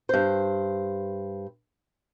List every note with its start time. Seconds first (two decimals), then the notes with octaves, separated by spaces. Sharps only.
0.09 G2 C5